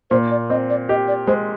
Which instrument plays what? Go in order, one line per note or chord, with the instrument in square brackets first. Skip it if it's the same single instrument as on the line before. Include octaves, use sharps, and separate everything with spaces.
[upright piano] A#2 [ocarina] C5
[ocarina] D5
[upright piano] C4 [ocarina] D#5
[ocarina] D5
[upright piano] G4 [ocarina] D#5
[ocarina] D5
[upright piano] G#3 [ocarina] C5